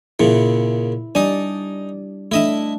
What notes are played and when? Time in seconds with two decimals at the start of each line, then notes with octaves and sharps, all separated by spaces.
0.20 A#2 C#3 E4
1.15 G3 D4 D#4 D5 G#5
2.32 A3 D4 E4 D#5 E5